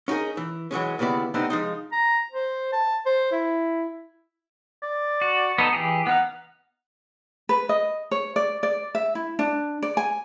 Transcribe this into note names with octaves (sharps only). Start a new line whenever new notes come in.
C#4 D#4 G4 G#4 A#4
E3
E3 F#3 G#3 C#4
D#2 C#3 B3 E4 D5
C3 A3 B3 C4 D4 D#4
F3 G#3 D#4
A#5
C5
A5
C5
E4
D5
F#4
B3 D#4 A4
E3 G4 G#4
B3 D#4 F5 F#5
B4
D#5
C#5
D5
D5
E5
E4
D4
D5
G#5